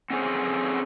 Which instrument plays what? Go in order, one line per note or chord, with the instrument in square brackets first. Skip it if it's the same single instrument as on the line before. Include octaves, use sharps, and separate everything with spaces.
[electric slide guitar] C4 C#4 G#4 A4 C5